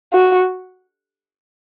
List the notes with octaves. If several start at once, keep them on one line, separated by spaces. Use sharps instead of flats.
F#4